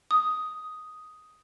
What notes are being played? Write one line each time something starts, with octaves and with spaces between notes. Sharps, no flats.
D#6